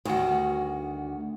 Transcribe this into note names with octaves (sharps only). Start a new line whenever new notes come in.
D2 D#3 G3 F#4